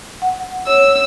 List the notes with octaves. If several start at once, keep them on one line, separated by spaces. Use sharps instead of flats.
F#5
C#5 E6